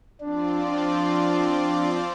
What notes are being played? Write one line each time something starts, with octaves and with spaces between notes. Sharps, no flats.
F3 C4 D4 F4 D5
D4